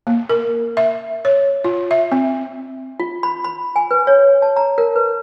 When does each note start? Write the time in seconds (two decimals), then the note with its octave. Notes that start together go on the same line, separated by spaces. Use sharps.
0.07 A#3
0.29 A#4
0.77 E5
1.25 C#5
1.64 F4
1.91 E5
2.12 C4
3.00 F4
3.23 B5
3.44 B5
3.76 G#5
3.91 B4
4.07 C#5
4.42 A5
4.56 A#5
4.78 A#4
4.96 B4